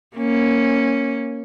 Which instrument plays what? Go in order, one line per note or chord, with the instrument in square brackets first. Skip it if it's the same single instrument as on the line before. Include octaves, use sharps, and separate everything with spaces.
[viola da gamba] A#3 C#4